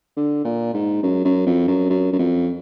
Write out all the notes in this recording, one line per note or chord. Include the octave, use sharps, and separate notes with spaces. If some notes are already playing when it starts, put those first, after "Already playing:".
D3
A#2
G#2
F#2
F#2
F2
F#2
F#2
F#2
F2